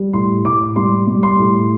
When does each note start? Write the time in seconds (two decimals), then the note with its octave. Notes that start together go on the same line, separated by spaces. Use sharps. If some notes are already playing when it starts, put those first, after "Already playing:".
Already playing: G3
0.13 A2 C6
0.45 A2 D6
0.76 G3 C6
1.07 G3
1.23 C6
1.39 A2